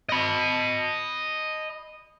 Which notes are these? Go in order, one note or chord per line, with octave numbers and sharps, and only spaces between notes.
D#5 B5